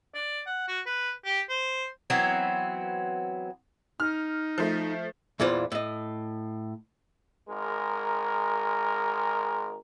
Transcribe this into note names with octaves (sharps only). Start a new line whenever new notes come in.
D5
F#5
F#4
B4
G4
C5
E3 F#3 B3 C4
D#4 F6
F3 A3
E2 A#2 E3 G3 F4 C5
A2 D#5
G#1 G#3 A#4